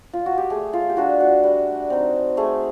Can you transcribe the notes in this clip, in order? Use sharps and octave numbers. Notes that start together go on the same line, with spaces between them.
F4
F#4
G4
A3 G#4
F4
G4
D4 F4 F#4
F#4
G3
C4 D#4
A3 G#4